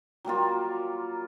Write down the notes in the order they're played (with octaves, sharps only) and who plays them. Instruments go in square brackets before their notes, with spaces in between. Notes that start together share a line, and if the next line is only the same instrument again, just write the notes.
[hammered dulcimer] F#3 G3 A#3 F4